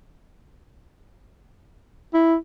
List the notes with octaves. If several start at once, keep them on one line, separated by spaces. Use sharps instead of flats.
E4